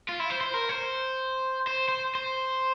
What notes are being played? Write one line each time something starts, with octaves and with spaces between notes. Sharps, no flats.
F4
E4
C5
C5
A#4
C5
C5
C5
C5